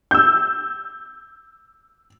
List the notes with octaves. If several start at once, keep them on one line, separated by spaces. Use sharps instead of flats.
E6 G6